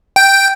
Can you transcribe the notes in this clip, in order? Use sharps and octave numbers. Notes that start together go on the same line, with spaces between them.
G5